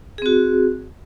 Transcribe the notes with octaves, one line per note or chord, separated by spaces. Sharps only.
C4 F#4 G#4